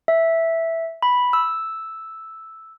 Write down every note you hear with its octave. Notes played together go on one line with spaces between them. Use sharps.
E5
B5
E6